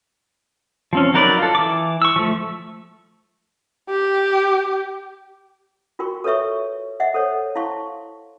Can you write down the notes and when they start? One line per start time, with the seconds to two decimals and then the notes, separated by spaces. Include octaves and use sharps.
0.93 F3 C4 C#4
1.14 F#3 D#4 A#4 B4 D5
1.39 F4 A4
1.55 E3 D6
2.02 C#6 E6
2.16 F3 A3
3.89 G4
5.99 F4 F#4 A#4 G5 C6 C#6
6.24 A4 B4 C#5 E5 C#6
7.00 D#5 E5 F#5
7.14 A4 C5 C#5
7.55 E4 F5 A5 C6 C#6